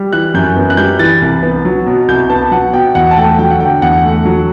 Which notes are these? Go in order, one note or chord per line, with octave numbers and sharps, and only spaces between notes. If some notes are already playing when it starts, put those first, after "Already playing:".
Already playing: G3
E3 F#6
F#2 G6
B3
F#6
G3 G6
E3 A6
C2
B3
F#3
B2
C2 G6
B3 A5
F#3 F#5
B2 G5
E2 F#5
A5
A3 G5
F#3 G5
F#5
D3 G5
E2 F#5
A3
F#3